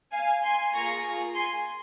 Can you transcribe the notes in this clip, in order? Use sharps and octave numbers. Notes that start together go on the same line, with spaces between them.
F5 G#5
G#5 C6
A#3 F4 G#4 A#5 C#6
G#5 C6